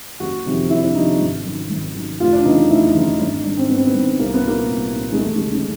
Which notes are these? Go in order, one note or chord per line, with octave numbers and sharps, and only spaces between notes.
F#1 F#4
F2 C3 D#3
F#1 E4
D4
F2 C3 D#3 D#4
G#1
F#2 D#3
G#1
F#2 D#3
F1 F4
D4
E2 C#3 E3 D#4
F1 E4
D#4
E2 C#3 E3
D#4
G#1 D4
D#4
G#2 D#3 D4
C4
G#1 B3
C4
B3
G#2 D#3
C2 A#3
B3
A#2 A#3
C2
A#2
G#3
E1 A3
G#3
D#2 C#3
G#3